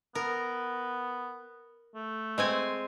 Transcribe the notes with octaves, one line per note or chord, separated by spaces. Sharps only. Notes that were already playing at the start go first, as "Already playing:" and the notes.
B3 A#4
A3
G#3 C4 G#5